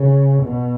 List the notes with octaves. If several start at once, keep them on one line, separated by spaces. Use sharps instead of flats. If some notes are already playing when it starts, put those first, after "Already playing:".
Already playing: C#3
B2